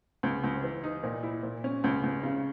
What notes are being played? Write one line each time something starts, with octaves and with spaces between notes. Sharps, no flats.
C#2
C#2
E3
D#4
A#2
E4
A#2
C#4
C#2
C#2
C#3